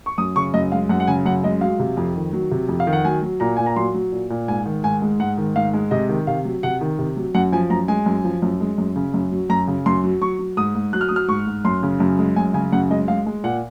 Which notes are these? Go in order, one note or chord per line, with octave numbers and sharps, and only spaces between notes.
C#6
F#2 D#6
C#3 C#6
F#2 D#5
G#3 F5
F#2 F#5
F#5
C#3 G#5
F#2 F#5
G#3 D#5
F#3 F5
C3
F2
D#3
F#3
C3
F2
F5
D#3
F#5
F#3 G#5
F#3
A#2 A#5
A#2 G#5
A#5
F#3 C6
F#3
A#2
A#2
G#2 G#5
D#3
G#2 G#5
G#3
G#2 F#5
D#3
G#2 F5
G#3
C3 D#5
D#3
C3 F5
F#3
C3 F#5
D#3
C3
F#3
F#2 F#5
F3 G#5
F#2 A#5
G#3 G#5
F#2
F3
F#2
G#3
F#2
C#3
F#2
F#3
F#2 A#5
C#3
F#2 C6
F#3
F#3 C#6
F#3
G#2 D#6
G#2
F#3 F#6
F6
F#3 D#6
F6
G#2 C#6
G#2
F#2 C6
C#3
F#2
G#3
F#2 G#5
C#3 G#5
F#2 F#5
G#3 D#5
G#3 F5
G#3
A#2 F#5